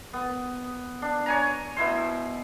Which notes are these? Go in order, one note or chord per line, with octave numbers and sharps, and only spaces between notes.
B3
D4
C#5 G#5 A#5
B2 E4 C5